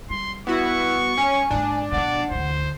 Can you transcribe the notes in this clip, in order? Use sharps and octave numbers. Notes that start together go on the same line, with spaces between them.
G3 C6
B3 E4 F#4 C#6
C#4 G#5
G#2 A#3 D4
B2 F#3 D5 F#5
D2 E3 C5